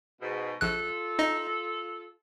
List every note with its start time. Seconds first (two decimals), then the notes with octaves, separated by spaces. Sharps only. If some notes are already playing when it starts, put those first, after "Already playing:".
0.21 G#2 B2
0.61 A#1 F4 A4 F#6
1.19 D#4 D#5